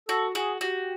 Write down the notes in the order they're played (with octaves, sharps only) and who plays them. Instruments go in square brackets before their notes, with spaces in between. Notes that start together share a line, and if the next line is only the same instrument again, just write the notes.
[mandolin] F#4 [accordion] A4
[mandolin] F#4 [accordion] G#4
[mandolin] F#4 [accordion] G4